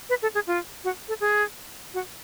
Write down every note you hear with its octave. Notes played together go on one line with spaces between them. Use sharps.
B4
A4
G#4
F4
F#4
A4
G#4
F#4